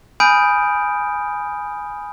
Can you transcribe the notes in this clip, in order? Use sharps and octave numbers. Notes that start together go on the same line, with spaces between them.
G#5 B5 D#6 F6 G6 D7